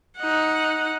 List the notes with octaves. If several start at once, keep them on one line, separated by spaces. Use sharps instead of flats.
D#4 F#5